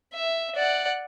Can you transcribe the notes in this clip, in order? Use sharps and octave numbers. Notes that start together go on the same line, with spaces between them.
E5
D5 F#5